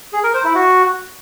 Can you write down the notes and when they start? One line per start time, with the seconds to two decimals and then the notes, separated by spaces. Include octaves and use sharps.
0.13 G#4
0.23 A#4
0.34 C5
0.44 E4
0.55 F#4